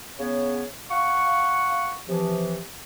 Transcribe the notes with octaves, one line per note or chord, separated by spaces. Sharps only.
C#3 B3 C#5
F5 F#5 C#6
C3 E3 F3